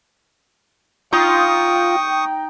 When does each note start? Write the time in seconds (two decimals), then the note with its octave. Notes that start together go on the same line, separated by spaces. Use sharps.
1.13 D#4 F4 G5 C#6 D#6